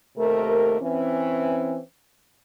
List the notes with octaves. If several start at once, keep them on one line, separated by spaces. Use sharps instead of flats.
D#2 C3 A3 A#4
E3 C4 C#4